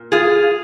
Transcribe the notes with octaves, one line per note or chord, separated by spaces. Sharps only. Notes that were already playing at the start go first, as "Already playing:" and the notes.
Already playing: A#2
F4 G#4